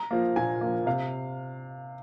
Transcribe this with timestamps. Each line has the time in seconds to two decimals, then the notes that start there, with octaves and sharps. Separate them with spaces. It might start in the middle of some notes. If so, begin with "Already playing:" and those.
Already playing: A#5
0.11 F3 A#3
0.36 A#2 G#5
0.61 F3 A#3
0.86 C3 F5